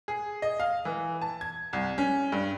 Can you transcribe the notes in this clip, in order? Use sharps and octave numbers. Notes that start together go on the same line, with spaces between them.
G#4
D#5
F5
E3
A5
G#6
C2
C#4
G2